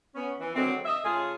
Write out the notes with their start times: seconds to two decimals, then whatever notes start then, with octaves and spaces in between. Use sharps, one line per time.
0.15 B3 C#4
0.41 E3
0.56 D3 D#3 F#3 G#3 C4
0.85 D#5 E5
1.04 C#3 A3 F4 G#4